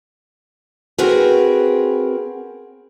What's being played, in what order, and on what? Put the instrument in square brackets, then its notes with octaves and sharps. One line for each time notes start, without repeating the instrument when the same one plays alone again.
[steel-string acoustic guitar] C4 F#4 G#4 A#4 B4